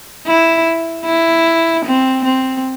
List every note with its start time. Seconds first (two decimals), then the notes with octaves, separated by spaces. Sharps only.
0.27 E4
1.05 E4
1.85 C4
2.24 C4